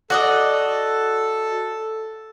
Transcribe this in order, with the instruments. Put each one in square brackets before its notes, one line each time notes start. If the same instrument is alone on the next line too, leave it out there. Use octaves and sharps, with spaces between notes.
[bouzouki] F#4 D5 D#5 [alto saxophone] A4